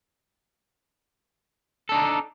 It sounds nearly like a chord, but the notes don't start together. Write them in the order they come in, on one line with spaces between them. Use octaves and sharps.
A4 D4 D#4